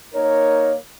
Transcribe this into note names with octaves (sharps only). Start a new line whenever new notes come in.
A#3 D#4 A#4 C#5